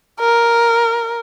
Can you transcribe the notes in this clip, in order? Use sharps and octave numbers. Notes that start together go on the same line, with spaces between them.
A#4